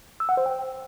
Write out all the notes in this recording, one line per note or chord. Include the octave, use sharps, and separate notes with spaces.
E6
F#5
C5
G5